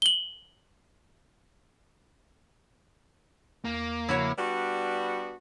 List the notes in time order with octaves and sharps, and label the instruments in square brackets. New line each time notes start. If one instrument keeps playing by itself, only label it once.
[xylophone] F#7 G7
[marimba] E2 [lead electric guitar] A#3
[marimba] C#3 F3 [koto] E4 F#4 C#5
[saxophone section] G3 B3 D4 F#4